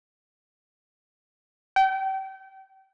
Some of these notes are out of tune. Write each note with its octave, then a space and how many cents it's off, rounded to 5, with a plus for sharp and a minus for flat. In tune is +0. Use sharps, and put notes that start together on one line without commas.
G5 -30